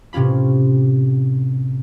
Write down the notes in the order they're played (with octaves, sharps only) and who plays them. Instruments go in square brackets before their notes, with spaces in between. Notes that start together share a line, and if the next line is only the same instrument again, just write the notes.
[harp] A2 C3 C#4 F4 B5